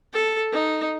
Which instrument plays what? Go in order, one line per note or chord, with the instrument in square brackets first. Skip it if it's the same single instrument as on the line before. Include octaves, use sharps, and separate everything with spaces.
[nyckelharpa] A4
D#4